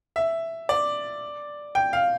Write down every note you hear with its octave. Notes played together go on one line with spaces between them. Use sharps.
E5
D5
G5
F5